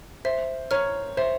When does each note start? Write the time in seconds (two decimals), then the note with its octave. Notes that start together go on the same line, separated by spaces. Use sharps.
0.25 C5 E5
0.71 C#5 A#5 F6
1.17 C5 E5